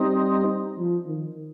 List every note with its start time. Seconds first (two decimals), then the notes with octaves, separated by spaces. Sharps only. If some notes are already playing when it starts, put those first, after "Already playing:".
Already playing: G3 C4 D#4
0.78 F3
1.07 D#3